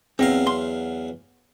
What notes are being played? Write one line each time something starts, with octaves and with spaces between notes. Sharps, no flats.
E2 F#3 C4 F5
C6